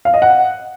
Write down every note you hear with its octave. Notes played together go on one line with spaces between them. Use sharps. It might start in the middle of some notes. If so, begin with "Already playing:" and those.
F5
D#5
F#5